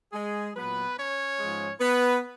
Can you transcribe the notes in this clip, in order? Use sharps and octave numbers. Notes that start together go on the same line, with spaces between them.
G#3 G#4
A#2 F#3 B3 B4
C#4 C#5
G#2 F3 G#3
B3 B4